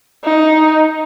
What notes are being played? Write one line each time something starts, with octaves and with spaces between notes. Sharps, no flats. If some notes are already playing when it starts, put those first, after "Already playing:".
D#4